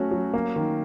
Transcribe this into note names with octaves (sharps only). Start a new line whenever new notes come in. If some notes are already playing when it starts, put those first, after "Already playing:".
Already playing: F#3 A3 C#4 F#4
F#3
A#3
D#3